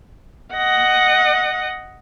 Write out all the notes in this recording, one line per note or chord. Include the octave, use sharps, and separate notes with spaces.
D#5 F#5